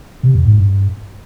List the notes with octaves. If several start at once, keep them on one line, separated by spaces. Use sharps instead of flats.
C3
E2
G#2
G2